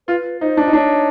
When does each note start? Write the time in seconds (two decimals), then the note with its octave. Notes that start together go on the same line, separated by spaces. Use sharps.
0.08 F4 B4
0.41 D#4 C5
0.57 D4
0.68 D#4
0.73 D4 C#5